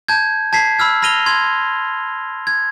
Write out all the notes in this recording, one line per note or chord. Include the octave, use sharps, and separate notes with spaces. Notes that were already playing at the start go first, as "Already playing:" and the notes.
A5 G6 G#6
A5 G#6 B6 C7
B5 E6 F6 G#6
B5 F6 A#6 D#7 F7 G7
C6 G#6
G#6